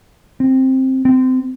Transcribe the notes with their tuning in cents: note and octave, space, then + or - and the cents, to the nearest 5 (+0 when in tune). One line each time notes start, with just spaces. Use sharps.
C4 +10
C4 -25